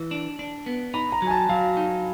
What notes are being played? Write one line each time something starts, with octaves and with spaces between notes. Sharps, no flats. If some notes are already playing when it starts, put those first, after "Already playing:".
Already playing: E3
D4
D4
B3
D#4 B5
A#5
F#3
G#5
A5
F#3 F5
D#4